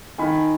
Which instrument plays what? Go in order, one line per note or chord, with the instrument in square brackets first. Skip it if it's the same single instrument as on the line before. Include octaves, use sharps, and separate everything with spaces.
[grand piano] D#3 G#5 B5